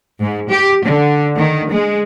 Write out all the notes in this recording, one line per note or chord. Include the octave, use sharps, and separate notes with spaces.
G#2
G4
D3
D#3
G#3